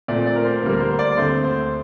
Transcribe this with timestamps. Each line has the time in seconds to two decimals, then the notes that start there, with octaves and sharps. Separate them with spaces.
0.08 A#2 A3 C4 D5
0.27 D5
0.36 A#4
0.44 C5
0.62 D2 D3 G3 A#3 A#4
0.73 A#4
0.80 C5
0.99 D5
1.16 D2 D3 A3 C4 C5
1.44 C5